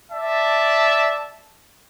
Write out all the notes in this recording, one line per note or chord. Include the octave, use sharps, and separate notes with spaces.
D5 E5 A5